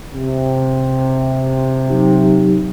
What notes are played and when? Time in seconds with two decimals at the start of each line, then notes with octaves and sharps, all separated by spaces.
0.13 C3
1.88 F#3 D#4 G4